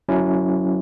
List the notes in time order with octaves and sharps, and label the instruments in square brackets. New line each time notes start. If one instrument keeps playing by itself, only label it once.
[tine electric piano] F#3 C#4 E4